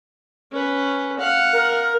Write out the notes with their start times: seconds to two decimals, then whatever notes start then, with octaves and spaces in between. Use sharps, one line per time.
0.52 C#4 B4
1.19 F5 F#5
1.53 A#4